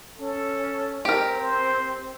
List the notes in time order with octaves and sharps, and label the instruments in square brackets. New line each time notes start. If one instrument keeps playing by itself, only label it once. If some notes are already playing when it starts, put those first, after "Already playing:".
[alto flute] C#4 [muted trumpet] A4
[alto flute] C4 [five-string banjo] G4 A#4
[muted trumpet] C5